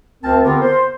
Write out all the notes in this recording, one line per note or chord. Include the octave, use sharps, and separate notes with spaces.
D2 C4 A#4 A5
D3 B3 C4 F4 G4 A#4
C5